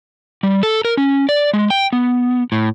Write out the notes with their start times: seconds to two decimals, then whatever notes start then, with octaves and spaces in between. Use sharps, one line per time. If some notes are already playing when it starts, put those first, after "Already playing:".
0.43 G3
0.63 A4
0.85 A#4
0.97 C#4
1.29 D5
1.54 G#3
1.70 G5
1.93 B3
2.52 A2